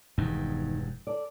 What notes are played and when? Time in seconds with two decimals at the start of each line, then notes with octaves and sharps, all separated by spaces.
0.18 E1 E2 G2 D#3 D#4
1.07 A4 D5